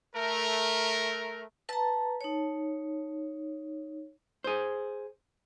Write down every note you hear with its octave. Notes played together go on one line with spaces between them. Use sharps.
A3 A#4
B4 A5 A#5
D#4 C#5
G#4 C5